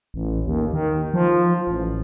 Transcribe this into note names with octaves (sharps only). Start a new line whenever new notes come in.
A1
D#2
D#3
F3
A1